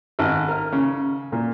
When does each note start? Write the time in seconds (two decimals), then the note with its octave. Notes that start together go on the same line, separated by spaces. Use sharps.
0.19 G#1
0.48 A#4
0.72 C#3
1.32 A#2